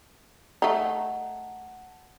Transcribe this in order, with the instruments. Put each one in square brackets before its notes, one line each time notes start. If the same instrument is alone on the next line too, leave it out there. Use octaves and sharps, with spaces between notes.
[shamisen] A3 D#4 [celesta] F#5 A5